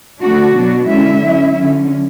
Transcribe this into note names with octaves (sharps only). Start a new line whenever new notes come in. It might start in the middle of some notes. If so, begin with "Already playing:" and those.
D3 A3 D4 F#4
B2 F#3 B3 D4
D3 G#3 C#4 E4 E5
F#3 C#4 E4
D3 F#3 C#4